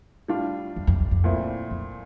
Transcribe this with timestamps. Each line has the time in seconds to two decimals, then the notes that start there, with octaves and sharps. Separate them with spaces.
0.28 A2 G3 D4 F4
0.76 F2
0.87 F2
1.00 E2
1.11 F2
1.24 A#2 A3 C4 E4
1.71 F2